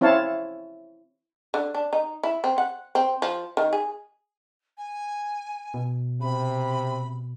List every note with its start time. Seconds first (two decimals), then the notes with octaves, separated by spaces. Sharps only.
0.01 C4 E4 C#5 F5 A5
1.54 D3
1.74 D4
1.93 D#4
2.23 E4
2.44 C4
2.58 F#5
2.95 C4
3.22 F3
3.57 D#3
3.73 G#4
4.77 G#5
5.74 B2
6.21 C3 B5